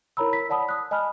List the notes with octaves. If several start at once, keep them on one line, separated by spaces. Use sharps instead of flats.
E4 A#4 C#5 A#5 B5 E6
B6
C#5 D5 F#5 A5 B5 D#6
D#6 F#6
D#5 G#5 A5 B5 F6